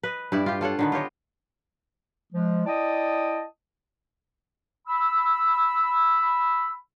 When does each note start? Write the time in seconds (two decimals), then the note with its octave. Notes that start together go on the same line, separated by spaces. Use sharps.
0.03 B4 D#5
0.32 G2 E4 D5
0.46 F4 G4
0.61 F4 A4 C#5 F#5
0.79 D3 D#3 B3
0.92 F4 G4 C#5 D#5
2.33 F3 G#3
2.67 E4 D5 D#5 G5 A5 D#6
4.88 B5 E6